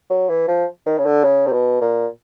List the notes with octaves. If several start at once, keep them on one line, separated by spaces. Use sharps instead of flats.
F#3
E3
F3
D#3
C#3
D3
C#3
C3
B2
A#2